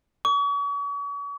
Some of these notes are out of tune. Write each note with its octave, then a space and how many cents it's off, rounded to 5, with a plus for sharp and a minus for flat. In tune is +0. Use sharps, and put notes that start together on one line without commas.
C#6 +40